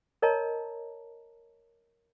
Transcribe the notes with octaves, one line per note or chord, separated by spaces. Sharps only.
A#4 C#5 D#5 A5 A#5